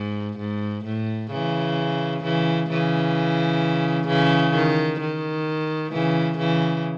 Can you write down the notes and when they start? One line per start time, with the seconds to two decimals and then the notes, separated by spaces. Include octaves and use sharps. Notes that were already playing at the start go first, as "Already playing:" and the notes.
Already playing: G#2
0.39 G#2
0.85 A2
1.31 C#3 E3
2.24 C#3 E3
2.70 C#3 E3
4.07 C#3 E3
4.54 D#3
5.00 D#3
5.92 C#3 E3
6.38 C#3 E3